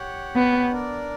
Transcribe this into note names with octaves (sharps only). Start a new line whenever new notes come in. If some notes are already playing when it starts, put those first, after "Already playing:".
Already playing: G4 C#5 F#5
B3
D4 A#4 D5